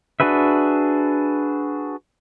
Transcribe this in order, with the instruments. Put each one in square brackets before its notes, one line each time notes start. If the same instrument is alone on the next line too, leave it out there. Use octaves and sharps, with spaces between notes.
[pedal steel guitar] D4 F#4 G#4 B4 E5